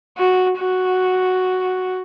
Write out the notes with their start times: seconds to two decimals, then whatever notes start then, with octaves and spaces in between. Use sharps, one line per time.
0.18 F#4
0.58 F#4